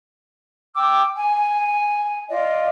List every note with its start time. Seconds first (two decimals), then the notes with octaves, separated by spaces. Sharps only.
0.74 G5 D6 E6
1.15 G#5
2.28 F4 D5 D#5